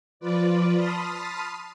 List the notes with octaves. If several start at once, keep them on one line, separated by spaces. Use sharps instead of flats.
F3 F4 B4 D5
A5 B5 C6 D#6 F6